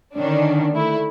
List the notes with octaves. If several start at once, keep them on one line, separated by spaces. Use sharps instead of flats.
D3 D#3 C#4 D4
A3 E4